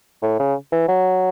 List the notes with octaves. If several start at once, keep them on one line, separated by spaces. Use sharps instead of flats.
A2
C#3
E3
F#3